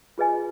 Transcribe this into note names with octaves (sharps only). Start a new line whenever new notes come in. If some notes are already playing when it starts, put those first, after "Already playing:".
F4 G#4 B4 D#5 G#5